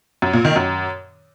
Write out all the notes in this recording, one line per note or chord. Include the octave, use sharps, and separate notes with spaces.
F#2
A#2
D#3
F#2